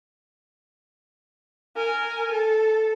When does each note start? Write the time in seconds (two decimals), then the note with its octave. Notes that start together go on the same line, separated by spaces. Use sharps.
1.76 A#4 G#5
2.31 A4